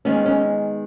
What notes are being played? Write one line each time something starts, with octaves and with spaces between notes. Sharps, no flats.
D#3 G#3 B3 C#4
C#4